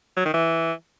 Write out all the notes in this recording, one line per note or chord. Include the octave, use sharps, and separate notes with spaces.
F#3
D#3
E3